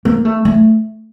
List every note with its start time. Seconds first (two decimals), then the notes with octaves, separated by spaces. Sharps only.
0.05 A#3
0.25 A3
0.45 A3